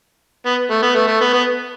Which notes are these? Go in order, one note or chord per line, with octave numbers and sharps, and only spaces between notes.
B3
A3
B3
A3
A3
B3
B3